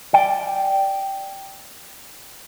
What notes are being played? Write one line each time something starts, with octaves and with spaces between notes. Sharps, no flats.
D5 G5